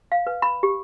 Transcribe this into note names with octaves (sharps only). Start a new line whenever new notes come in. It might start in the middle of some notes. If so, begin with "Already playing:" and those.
F5
B4
B5
G4